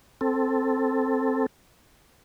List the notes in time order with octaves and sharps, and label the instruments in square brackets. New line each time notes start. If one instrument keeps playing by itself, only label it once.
[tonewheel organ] C4 A4